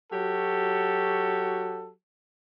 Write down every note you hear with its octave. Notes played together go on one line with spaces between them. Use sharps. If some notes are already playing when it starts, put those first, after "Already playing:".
F#3 F#4 G4 A4